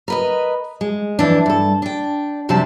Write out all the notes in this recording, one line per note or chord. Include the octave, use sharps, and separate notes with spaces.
A#4 B4 D#5
G#3
F2 E3 D4
G2 A4
D4 G5
F#2 C3 F3 G3 C5 A5